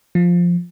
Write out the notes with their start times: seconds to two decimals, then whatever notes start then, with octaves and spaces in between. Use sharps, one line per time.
0.15 F3